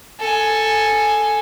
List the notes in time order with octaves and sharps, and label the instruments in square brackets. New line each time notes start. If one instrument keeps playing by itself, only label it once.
[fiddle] A4 G#5